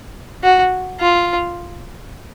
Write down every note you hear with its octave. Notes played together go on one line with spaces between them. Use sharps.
F#4
F4